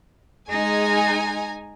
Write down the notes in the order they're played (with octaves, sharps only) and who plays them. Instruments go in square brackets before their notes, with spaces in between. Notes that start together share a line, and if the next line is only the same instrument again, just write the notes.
[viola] G#3 G#4 [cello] D#4 [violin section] G#5 A#5